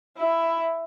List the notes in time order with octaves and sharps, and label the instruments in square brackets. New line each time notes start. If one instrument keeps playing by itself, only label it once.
[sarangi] E4